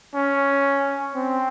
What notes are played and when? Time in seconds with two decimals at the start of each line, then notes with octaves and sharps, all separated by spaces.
0.15 C#4
1.15 C4